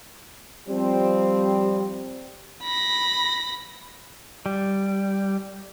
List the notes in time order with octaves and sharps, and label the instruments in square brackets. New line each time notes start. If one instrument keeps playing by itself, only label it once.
[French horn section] F3 C4 [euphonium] G3
[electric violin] B5 A#6
[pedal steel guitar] G3